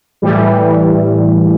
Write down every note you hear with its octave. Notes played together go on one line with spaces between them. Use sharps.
A2 E3 G3